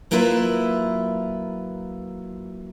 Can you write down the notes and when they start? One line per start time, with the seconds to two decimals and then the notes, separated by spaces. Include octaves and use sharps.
0.11 F#3 A#3 E4 F4 B4 E5